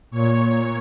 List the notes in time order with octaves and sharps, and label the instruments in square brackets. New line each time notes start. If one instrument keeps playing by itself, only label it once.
[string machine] A#2 C#5